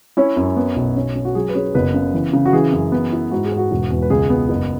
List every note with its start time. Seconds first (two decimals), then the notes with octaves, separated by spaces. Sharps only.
0.17 C#4 E4 C#5
0.37 F#2
0.56 B3
0.76 B1
0.96 C#4
1.16 C#4
1.25 F#4
1.35 F#3 G#4
1.49 B4
1.55 C#4 G#4
1.74 F#1 B3 B4
1.94 C#3
2.14 E3
2.33 C#3
2.46 F#4
2.53 E3 G#4
2.72 F#2
2.92 B3
3.12 E4
3.31 G#2 F#4
3.45 G#4
3.51 G#2
3.57 F#4
3.71 E1
3.90 E2
4.02 B4
4.10 C#2 G#4
4.30 B3
4.49 F#1